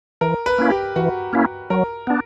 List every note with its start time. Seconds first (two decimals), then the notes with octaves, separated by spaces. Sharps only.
0.21 E3 A#4
0.46 B4
0.58 A#3 C#4 E4
0.70 G4
0.96 E3 F#4
1.33 A#3 C#4 E4
1.70 F#3 A#4
2.07 B3 D4